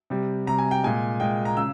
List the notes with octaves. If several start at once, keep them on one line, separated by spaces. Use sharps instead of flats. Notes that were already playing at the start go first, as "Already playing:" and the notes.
C3 G3
C3 G3 A#5
G#5
G5
A#2 G#3 G#5
A#2 G#3 G5
A#5
C#3 E6